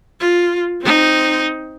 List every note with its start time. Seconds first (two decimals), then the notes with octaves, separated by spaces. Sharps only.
0.20 F4
0.81 C4 D#4